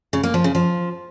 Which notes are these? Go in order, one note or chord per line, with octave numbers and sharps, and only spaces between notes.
C#3
A#3
F3
C#3
F3